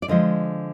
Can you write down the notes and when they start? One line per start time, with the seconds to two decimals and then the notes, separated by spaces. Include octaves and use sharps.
0.02 D5
0.08 D3 F3 G#3 D#5